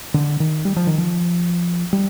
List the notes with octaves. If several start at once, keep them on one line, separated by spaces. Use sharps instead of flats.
D3
D#3
G3
F3
D#3
F3
G3